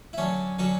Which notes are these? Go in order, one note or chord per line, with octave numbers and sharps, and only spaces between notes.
E4
D3 F#3 C#4 D4
D3 F#3 C#4 F#4